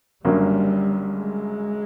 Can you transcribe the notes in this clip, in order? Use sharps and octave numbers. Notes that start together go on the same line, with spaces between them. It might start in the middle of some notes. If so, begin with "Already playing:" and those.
F#1 F#2 D3 F#3 G3 A#3
G#3